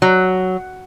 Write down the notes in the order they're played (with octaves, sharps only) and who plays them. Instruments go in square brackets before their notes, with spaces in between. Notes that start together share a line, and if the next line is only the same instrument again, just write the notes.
[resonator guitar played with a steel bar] F#3